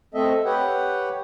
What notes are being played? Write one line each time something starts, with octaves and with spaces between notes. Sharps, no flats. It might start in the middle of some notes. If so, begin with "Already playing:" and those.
A3 C4 A4 D#5 E5
G4 B4 C#5 F#5 G5